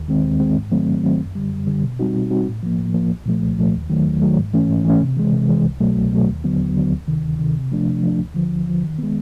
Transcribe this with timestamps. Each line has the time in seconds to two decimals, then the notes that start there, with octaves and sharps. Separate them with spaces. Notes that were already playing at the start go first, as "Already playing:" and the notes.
Already playing: D#2
0.08 D#3 G#3 C4
0.24 D#2
0.40 D#3 G#3 C4
0.56 G#2
0.71 D#3 F#3 A3 C4
0.88 G#2
1.03 D#3 F#3 A3 C4
1.19 F#2
1.35 D3 G3
1.51 F#2
1.67 D3 G3
1.83 B2
1.99 G3 C4 D#4 F#4
2.14 B2
2.31 G3 C4 D#4 F#4
2.47 A2
2.63 F3 A#3
2.78 A2
2.94 F3 A#3
3.10 C2
3.26 A#2 F3 A3
3.42 C2
3.58 A#2 F3 A3
3.74 D#2
3.90 D#3 F#3 A3
4.06 D#2
4.22 D#3 F#3 A3
4.37 G#2
4.54 E3 A3 C#4
4.70 G#2
4.85 E3 A3 C#4
5.01 C3
5.17 E3 G#3
5.33 C3
5.49 E3 G#3
5.65 C2
5.80 B2 F#3 A3
5.96 C2
6.12 B2 F#3 A3
6.28 D#2
6.44 D3 F#3 B3
6.60 D#2
6.76 D3 F#3 B3
6.92 D2
7.08 C3 D#3
7.24 D2
7.39 C3 D#3
7.55 C3
7.72 F3 A3 D4
7.87 C3
8.03 F3 A3 D4
8.19 D2
8.35 D3 F3
8.51 D2
8.67 D3 F3
8.83 D#3
8.99 G#3 B3